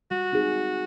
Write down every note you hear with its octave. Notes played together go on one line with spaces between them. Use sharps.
G3 F#4
C4 D#4 G#4